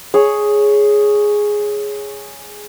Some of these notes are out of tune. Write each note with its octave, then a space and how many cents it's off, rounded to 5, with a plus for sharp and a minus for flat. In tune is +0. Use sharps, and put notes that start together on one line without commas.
G#4 +0 C#5 +0